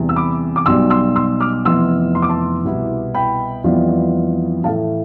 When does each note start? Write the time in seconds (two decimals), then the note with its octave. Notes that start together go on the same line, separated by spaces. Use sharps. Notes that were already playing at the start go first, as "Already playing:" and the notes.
Already playing: E2 C3 G3
0.09 E6
0.16 B5 D6
0.56 D6
0.66 B1 B2 G3 C6 E6
0.90 C6 E6
1.16 C6 E6
1.40 D6 F6
1.65 F1 F2 E3 B3 C6 E6
2.15 C6
2.22 D6
2.29 A5 C6
2.65 C2 B2 B3 E4
3.14 G5 B5
3.64 F2 E3 G3 B3 F4
4.64 A2 E3 A3 F5 A5